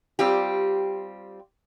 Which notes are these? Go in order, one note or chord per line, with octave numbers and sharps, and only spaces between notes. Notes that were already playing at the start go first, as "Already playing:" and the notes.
G3 C4 F4 G4